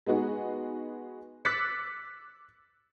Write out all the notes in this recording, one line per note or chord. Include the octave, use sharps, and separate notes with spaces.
G#3 B3 D#4 F#4 G#4
D6 E6 F#6 A6 B6 C#7